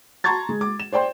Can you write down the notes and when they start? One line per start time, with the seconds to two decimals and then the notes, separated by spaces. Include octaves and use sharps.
0.24 A5 A#5 C6 C#6 G#6 A6
0.49 G#3
0.61 D6
0.80 E7
0.92 C5 D5 G5 C6